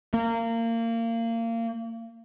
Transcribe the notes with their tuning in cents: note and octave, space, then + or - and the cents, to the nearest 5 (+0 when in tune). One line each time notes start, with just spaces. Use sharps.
A#3 -25